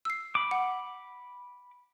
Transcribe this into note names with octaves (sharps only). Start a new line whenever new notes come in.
E6 C7
B5 D6
F#5